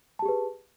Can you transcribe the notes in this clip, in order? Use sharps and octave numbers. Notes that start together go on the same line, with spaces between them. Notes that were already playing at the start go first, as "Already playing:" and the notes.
G4 G#4 B4 A5